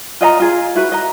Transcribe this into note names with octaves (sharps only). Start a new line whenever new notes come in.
F4 D#5 F5 A#5
F4 G#4
E4 F#4 B4
D#5 A#5